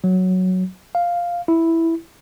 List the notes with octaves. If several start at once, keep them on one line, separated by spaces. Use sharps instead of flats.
F#3
F5
E4